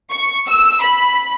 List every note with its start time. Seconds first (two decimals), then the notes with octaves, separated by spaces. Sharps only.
0.12 C#6
0.49 E6
0.83 B5